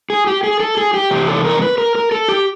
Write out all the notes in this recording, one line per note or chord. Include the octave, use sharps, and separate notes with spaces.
G#4
G4
G#4
A4
G#4
G4
E2 C3 G4
A4
A#4
B4
A#4
A#4
A4
G4